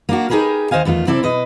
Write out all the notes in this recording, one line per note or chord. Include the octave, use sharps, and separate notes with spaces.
A#3 D4 F#4
D#4 G4 G#4 A#4 B4
D#2 D#3 C5 D#5 F5 G#5
E2 D#3 A3 F4
C3 C4 E4 A4 D5
B2 B4 D#5